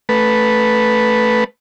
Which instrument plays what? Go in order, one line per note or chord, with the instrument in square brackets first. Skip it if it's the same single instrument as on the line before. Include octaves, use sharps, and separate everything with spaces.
[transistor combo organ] A3 B4